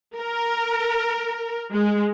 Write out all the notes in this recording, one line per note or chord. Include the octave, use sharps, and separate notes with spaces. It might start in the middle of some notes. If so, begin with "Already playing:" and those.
A#4
G#3